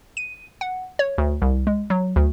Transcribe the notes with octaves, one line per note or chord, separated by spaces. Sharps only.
D#7
F#5
C#5
D2
C2
G#3
F#3
D2